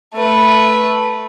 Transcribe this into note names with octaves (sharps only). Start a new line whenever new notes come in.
A3 B4